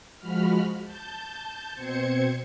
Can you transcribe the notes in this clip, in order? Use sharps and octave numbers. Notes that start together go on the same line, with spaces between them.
F3 G#3 F#4 B5 F6
A5 G6
B2 C4 C5 G#6 C#7